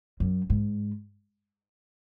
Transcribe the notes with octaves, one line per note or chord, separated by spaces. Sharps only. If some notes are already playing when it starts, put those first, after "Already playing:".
F#2
G#2